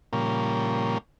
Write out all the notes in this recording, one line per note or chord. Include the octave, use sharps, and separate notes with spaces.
A#2 C#3 F3 G3 A#3